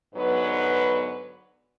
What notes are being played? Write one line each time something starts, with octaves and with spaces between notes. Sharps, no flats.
G#2 D3 F#3 B3 B4